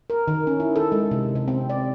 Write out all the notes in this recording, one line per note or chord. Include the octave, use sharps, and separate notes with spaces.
A#4
D#3
C#4
E4
A4
G#3
C3
C3
C4
D5